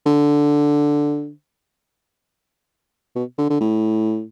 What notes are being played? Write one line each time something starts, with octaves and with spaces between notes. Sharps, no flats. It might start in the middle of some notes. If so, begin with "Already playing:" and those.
D3
B2
D3
D3
A2